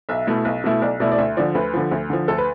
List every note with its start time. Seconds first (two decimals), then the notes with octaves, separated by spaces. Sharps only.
0.09 B1 E5
0.27 B2 A3 E4
0.45 B1
0.64 B2 A3 E4
0.82 B1 D5
1.00 B2 A3 E4 D5
1.12 D5
1.18 D2 E5
1.37 D3 F3 D5
1.55 D2 B4
1.74 D3 F3
1.91 D2
2.10 D3 F3
2.28 D2 A4
2.38 B4